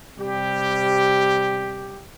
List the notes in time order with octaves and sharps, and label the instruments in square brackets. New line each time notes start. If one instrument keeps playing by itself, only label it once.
[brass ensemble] C3 G3 G4